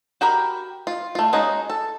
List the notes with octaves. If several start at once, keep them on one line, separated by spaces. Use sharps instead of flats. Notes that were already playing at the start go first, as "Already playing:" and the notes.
F#4 G4 A#4 B5
F4
A3 F4
G#3 C#4 D#4 F#4
A4